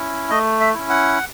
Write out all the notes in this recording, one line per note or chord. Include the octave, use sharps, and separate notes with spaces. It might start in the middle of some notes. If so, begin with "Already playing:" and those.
Already playing: C#4 E4
A3 D#5
E5
C#4 E4
F#5